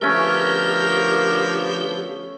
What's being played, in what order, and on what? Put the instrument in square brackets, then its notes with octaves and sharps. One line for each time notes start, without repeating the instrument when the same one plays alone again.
[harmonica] D3 F3 B3 [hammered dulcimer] A3 C#4 [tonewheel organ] G4 [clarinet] A#4